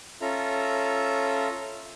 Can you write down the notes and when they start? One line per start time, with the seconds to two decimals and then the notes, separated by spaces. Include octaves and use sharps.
0.21 C#4 F4 A4 E5 A#5